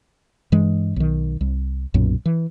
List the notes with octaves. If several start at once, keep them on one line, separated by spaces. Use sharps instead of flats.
G2 E3 G#3
B1 D#3
C2
B1 F#2 A#2
E3